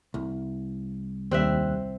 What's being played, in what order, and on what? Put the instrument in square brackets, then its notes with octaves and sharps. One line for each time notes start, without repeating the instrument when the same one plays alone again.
[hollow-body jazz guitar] C2
[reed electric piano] D#2 G3 F#6 [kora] C4 E5